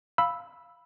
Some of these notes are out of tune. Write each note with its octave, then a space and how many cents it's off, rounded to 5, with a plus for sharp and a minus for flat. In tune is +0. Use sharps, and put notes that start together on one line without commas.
F5 +0 B5 +0 E6 +0